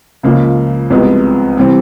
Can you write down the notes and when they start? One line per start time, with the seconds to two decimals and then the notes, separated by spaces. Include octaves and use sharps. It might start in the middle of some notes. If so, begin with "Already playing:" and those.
0.23 C#2 C#3 F3 A#3
0.90 C2 C3 F3 G#3 B3
1.57 C3 E3 G3 C4